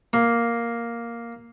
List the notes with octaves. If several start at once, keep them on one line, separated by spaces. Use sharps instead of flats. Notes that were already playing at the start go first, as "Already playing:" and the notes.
A#3